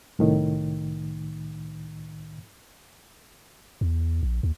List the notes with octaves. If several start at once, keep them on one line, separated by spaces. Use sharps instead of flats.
C2 A2 D#3
E2
A#1
D#2